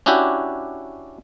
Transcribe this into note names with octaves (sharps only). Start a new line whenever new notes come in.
C#4 D4 E4 F#4 G4